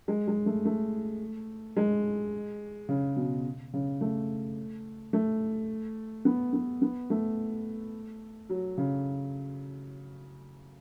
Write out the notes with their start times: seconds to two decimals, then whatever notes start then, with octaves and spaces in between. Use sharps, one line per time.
0.08 G#3
0.28 G#3
0.46 A3
0.65 A3
1.77 G#3
2.89 C#3
3.17 B2
3.73 C#3
4.01 A3
5.13 A3
6.25 B3
6.53 B3
6.82 B3
7.10 A3
8.49 F#3
8.78 C#3